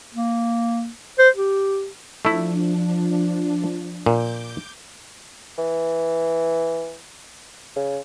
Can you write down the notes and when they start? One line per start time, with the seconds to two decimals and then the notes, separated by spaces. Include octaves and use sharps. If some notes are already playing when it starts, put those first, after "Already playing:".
0.14 A#3
1.18 C5
1.36 G4
2.25 F3 A3 D4 E4
4.06 A#2 D6 G6
5.58 E3
7.76 C#3